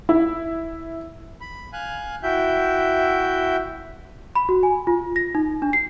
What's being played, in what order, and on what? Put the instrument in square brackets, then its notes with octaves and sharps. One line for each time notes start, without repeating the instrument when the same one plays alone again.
[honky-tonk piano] E4
[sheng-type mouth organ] B5
F5 G#5 F#6
E4 F#4 E5 G5 G6
[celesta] B5
F#4
G#5
F4
A#6
D#4
D4
C7